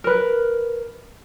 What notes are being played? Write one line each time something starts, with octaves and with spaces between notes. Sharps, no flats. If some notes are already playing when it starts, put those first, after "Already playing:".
A#4 B4